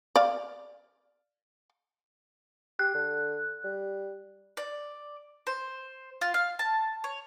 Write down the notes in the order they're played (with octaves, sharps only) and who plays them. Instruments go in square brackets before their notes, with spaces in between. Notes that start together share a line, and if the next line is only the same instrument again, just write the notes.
[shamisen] D5 F5
[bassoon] G4 [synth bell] F#6
[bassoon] D3
G3
[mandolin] D5
C5
F4
F5
A5
C#5